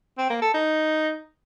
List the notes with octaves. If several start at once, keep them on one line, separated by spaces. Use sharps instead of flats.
C4
A#3
A4
D#4